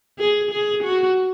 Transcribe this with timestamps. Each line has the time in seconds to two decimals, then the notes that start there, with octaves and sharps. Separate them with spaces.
0.18 G#4
0.51 G#4
0.83 F#4